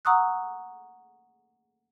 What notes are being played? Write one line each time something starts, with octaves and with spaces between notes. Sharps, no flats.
F#5 A#5 C#6 D#6 E6 F#6